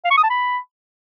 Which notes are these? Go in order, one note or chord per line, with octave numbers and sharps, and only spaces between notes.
F5
C#6
D#6
A5
B5